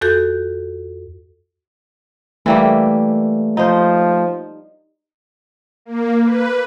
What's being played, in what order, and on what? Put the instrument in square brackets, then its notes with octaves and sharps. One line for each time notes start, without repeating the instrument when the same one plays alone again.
[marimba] F2 F#4 A4 G6
[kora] E3 G3 A#3 [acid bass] A3
[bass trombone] F3 [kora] D#4 C5
[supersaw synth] A#3
B4